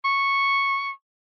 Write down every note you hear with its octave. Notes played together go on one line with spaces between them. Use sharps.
C#6